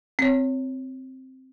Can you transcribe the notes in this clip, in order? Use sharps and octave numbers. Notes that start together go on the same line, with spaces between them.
C4 C#5